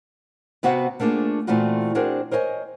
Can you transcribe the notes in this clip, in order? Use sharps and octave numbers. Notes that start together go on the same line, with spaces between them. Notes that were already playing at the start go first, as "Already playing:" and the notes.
C3 B3 F#4 C5 F5 F#5
A3 A#3 D4 F4 G#4
A#2 E3 A3 C4 F4 F#4
C4 D4 F#4 G#4 A#4 C5
A#4 C5 C#5 D#5 G5 G#5